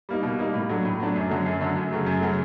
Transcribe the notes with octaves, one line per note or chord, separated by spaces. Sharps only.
G3 A#3 D#4
B2
G3 A#3 D#4
A2
F#3 A3 D4
A2
F#3 A3 D4
F#2
D3 F#3 A3
F#2
D3 F#3 A3
F#2
C#3 F#3 A3
F#2
C#3 F#3 A3